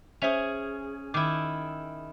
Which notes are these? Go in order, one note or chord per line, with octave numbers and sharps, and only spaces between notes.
C#4 G#4 C5 E5 F7
D#3 E4 D6